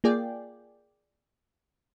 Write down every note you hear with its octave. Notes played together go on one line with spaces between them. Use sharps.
A#3 F4 G#4 D5 G5